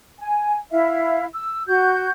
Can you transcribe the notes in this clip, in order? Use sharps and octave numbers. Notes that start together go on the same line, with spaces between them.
G#5
E4 E5 F5
E6
F#4 G6